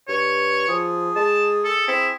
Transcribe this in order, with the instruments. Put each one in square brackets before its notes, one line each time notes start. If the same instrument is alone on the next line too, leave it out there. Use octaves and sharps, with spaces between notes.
[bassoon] G2 [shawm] C#5
[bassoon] F3 [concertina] G#4
[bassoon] G#3 [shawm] A5
[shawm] A4
[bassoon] C4 [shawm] E4